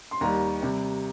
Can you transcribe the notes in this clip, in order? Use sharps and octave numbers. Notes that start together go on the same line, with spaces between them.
C6
D#2 D#3 G3 A#3 A#5
C3 G3